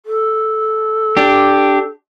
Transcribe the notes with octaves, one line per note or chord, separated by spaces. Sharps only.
A4
D4 G4